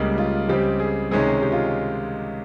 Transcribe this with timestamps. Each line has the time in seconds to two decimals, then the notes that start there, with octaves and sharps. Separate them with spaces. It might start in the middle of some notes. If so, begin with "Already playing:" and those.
Already playing: C#2 C#3 G3 A#3
0.18 F4
0.48 C#2 C#3 G3 C4 G4
0.80 G#4
1.11 C#2 C3 D#3 G#3 C#4 G#4
1.42 G4
1.52 F4